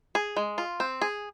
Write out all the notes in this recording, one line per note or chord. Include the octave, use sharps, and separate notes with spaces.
G#4
G#3
F4
C4
G#4